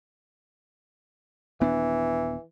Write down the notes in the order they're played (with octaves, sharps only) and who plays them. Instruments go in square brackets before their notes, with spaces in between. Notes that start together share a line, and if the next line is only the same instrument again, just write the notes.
[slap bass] D#1 B3 D4 [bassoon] E3